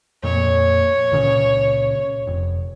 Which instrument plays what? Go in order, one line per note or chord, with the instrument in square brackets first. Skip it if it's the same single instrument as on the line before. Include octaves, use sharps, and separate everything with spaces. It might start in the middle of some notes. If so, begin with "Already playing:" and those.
[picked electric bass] F2 A#2 [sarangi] C#5
[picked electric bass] C#2 A#2 C#3
F1